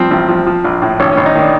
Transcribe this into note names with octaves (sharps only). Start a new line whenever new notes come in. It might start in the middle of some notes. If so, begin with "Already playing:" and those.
Already playing: G2 F3 C4
A1
F3
F3
A#1
A2
G#1 C#4
G#1 C#4
D#4
D#3 D4